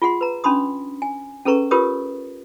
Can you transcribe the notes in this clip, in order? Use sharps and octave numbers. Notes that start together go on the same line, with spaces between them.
F4 G#4 F#5 C6
B4 A#5
C#4 D4 B5 C6 D#6
G#5
C#4 G#4 A4 B4 A#5 C#6
F4 G4 A#4 B4 C#5 D#6